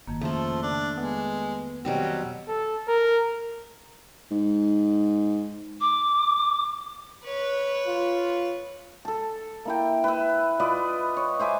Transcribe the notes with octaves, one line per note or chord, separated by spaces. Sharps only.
G1 F2 D#3 A#3
C#3 F3 A3 A4
D4
G#3 B3
B2 D#3 F#3 G3 C4 G4
A4
A#4
G#2
D6
B4 C#5
F4
A4 A5
A#3 E4 G5
B4 E5
F4 B4 D5 D#5
C#5
C5 E5 G#5 D6